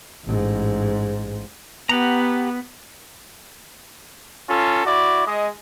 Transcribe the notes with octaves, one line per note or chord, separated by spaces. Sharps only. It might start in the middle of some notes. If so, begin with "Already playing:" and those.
A1 G#2
B3 G4 F#5 A#5
C#4 F4 A4
E4 F#4 D5
G#3 D#5